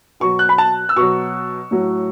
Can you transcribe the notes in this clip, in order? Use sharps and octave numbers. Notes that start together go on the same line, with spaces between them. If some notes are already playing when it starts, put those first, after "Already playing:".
B2 F#3 C#6
F#6
B5
A5
E6
B2 F#3 C#6
A2 F#3